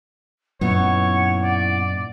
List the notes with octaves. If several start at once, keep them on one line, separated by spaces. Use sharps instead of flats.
F#2 A#2 B3 D#4 E4 C#5 F#5
D5